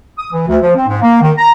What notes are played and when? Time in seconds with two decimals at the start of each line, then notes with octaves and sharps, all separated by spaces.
0.19 D#6
0.33 E3
0.48 D2
0.62 F3
0.76 C4
0.88 G#2
1.02 A#3
1.21 D#3
1.38 A#5